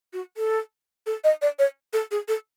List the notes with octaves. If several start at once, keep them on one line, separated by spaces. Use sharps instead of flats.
F#4
A4
A4
D#5
D5
C#5
A4
G#4
A4